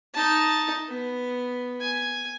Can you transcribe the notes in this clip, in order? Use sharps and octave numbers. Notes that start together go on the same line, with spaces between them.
D#4 A5
B3
G#5